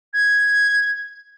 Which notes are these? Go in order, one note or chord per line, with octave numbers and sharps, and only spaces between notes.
G#6